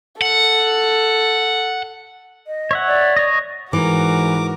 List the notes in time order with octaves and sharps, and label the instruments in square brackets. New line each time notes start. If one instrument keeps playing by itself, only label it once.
[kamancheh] A4 [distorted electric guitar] F#5
[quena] D#5
[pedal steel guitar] C#5 E5 F#5
[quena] D5
[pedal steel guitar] C#5 D#5
[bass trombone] G#2 [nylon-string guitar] E3 [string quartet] F#4 A#4 [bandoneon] D6